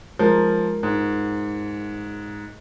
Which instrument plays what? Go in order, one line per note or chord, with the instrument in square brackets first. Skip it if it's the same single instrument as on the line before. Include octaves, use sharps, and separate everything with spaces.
[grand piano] F3 [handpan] G#3 F4 A#4
[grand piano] G#2